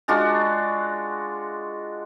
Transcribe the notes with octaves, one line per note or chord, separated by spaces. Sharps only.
G#3 D4 F4 F#4